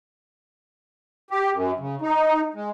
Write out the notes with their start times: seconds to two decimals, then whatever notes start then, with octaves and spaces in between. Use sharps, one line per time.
1.30 G4
1.54 F#2
1.79 C#3
2.01 D#4
2.54 G#3